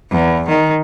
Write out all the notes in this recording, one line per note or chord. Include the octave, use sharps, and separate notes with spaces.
E2
D#3